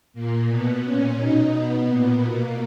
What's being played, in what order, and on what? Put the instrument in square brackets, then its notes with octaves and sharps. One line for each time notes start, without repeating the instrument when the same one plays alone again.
[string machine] A#2 A#3
B2 B3
A#2 C#4
B2 D#4
B2 B3
A#2
B2 A#3